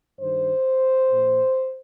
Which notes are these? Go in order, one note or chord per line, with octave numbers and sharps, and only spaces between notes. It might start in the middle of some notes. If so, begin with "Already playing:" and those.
G2 D#3 G3 C5
A#2 F3